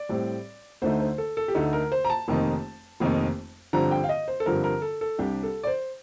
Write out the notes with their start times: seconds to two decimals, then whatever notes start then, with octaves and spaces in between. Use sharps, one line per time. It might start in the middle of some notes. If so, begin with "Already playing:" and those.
Already playing: D5
0.09 A2 G3 C4
0.82 D2 D3 A3 D#4 C5
1.00 C5
1.18 A4
1.37 A4
1.48 G4
1.55 D2 D3 A3 D#4 A4
1.73 A#4
1.92 C5
2.05 A#5
2.10 A5
2.28 F1 F2 D#3 A#3 D#4
3.00 F1 F2 D#3 A#3 D#4
3.73 G2 D3 F3 C4 A#5
3.91 G5
4.04 F5
4.09 D#5
4.28 C5
4.40 A4
4.46 G2 D3 F3 C4 A#4
4.64 A#4
4.82 A4
5.01 A4
5.18 C2 C3 G3 D4 G4
5.43 A4
5.63 D5
5.67 C5